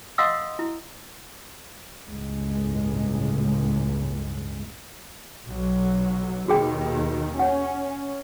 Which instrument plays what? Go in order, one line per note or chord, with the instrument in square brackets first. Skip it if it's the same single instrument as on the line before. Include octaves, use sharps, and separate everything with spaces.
[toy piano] D#5 F5 F#5 C6 D#6 E6
E4
[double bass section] G1 C#2 A2 G#3
B1 F#3
[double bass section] D#2 B2 D#3 [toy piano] F#4 G#4 G5
[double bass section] C#4 [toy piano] C#5 F#5